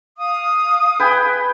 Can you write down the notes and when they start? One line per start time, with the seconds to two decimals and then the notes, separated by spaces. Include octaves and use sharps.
0.18 F5 D#6
1.00 B4 G5 G#5